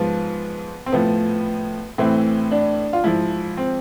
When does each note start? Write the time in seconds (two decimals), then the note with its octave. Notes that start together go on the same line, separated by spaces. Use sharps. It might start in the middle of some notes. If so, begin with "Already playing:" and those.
Already playing: G#2 F3 B3
0.86 C4
0.92 A2 F3 B3
1.98 A2 E3 C4
2.51 D4
2.93 F4
3.04 G#2 F3 E4
3.57 C4